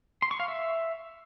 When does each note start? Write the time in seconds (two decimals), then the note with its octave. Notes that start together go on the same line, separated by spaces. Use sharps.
0.22 C6
0.31 C#6
0.40 F5
0.48 E5